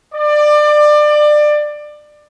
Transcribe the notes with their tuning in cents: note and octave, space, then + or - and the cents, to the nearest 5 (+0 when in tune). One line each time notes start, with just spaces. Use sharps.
D5 +25